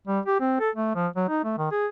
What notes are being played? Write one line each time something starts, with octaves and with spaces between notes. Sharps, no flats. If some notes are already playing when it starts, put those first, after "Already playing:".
G3
G4
C4
A4
A3
F3
F#3
D#4
A3
D#3
G#4